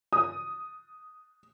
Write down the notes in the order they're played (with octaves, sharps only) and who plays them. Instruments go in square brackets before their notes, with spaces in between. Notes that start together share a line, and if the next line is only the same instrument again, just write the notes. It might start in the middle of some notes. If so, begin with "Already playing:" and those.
[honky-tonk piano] D#6